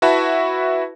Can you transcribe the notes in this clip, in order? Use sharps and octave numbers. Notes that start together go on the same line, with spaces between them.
E4 F#4 B4 E5 A5 B5